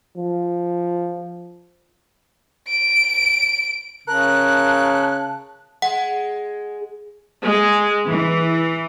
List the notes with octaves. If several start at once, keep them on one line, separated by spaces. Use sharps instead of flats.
F3
D7
C#3 A#4 A5 F#6
G#3 F#5
G#3
E3